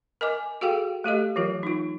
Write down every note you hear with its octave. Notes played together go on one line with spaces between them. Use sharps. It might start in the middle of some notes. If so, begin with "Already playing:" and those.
A#4 D#5 G#5 D6
F#4 G#4 A4 F5 G5
A3 G4 A4 D#5
E3 F#3 F4 A#4
D#4 F4